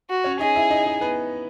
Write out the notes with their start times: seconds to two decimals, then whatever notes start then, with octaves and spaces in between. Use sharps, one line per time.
0.10 F#4
0.24 C#4 C#5
0.39 D#4 G#4 D#5
0.56 E4 E5
0.70 D#4 D#5
0.85 D#4 D#5
1.01 B3 B4